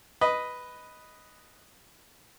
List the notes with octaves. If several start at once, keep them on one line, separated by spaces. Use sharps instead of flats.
B4 D#5